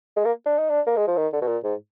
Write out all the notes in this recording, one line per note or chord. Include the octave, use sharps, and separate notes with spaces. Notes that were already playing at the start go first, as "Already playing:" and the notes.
G#3
A#3
D4
D#4
D4
A#3
G#3
F3
D#3
D3
B2
A#2
G#2